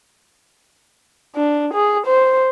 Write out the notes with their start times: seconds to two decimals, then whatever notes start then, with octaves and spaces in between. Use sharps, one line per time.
1.36 D4
1.73 G#4
2.06 C5